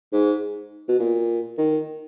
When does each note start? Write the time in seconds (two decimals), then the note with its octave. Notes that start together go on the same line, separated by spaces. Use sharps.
0.12 G#2
0.89 B2
0.99 A#2
1.58 D#3